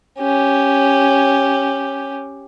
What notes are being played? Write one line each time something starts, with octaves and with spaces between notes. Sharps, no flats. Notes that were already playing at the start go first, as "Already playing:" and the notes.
C#4 G4